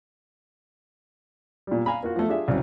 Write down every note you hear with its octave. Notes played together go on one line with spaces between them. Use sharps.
A#2 G3
F5 G#5 A#5 B5
A#3 F4 F#4
F3 A3
D4 F4 G4 G#4 E5
C2 C#3 F#3